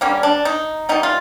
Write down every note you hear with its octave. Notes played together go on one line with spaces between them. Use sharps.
D3 G3 A#3 C#4
D4
D#4
E3 G3 B3 D#4
F4